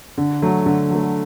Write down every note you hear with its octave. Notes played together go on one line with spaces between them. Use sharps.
D3
F#3 A3
D3
F#3 A3